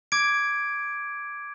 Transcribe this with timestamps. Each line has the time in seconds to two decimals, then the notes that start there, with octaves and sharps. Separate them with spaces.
0.12 D6 G#6 D7